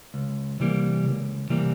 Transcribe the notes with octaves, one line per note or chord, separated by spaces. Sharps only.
C#2
C3 E3 G3 A#3
C#2
C3 E3 G3 A#3